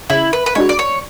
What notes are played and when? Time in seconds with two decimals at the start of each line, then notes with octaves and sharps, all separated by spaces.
0.10 C#3 E4
0.33 B4
0.46 B4
0.55 G#3 D4 F#4 C#5
0.69 D5
0.79 C#5